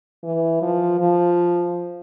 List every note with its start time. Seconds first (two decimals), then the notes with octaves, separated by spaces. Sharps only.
0.23 E3
0.62 F3
1.00 F3